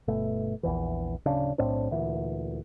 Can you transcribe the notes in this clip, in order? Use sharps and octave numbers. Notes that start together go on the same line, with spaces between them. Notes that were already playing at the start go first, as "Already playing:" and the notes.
G1 B2 A3
A#1 E2 E3
D1 C#3 D4
B1 A2 C4 D4
D2 A#2 E3